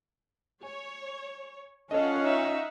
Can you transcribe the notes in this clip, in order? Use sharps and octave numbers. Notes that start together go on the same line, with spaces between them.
C#5 G#5
C#4 F4 A4 C#5 D#5 F5 F#5
D#4 E5